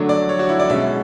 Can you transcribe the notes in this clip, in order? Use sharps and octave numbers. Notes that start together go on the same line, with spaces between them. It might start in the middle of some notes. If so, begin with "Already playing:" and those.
Already playing: D3 F#3 A3 D4
D5
C#5
F#4
E4
D5
B2 G#3 C#4 E5